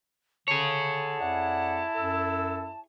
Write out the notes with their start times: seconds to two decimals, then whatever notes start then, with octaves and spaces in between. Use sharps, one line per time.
0.48 D3 G#4 C#5 A5
1.20 F2 E4 D5 F#5
1.96 F#2 A4 E6